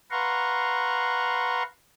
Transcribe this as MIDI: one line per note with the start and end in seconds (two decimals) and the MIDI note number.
0.11 1.63 71
0.11 1.63 77
0.11 1.63 78
0.11 1.63 82
0.11 1.63 84
0.11 1.63 85